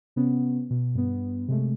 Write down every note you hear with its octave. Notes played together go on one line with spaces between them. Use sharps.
C3 B3 C#4
B2
G2 B3
C3 G#3 A3